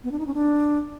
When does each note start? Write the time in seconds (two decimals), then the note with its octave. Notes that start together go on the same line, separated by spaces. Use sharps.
0.04 B3
0.11 D4
0.19 D#4
0.27 C#4
0.34 D4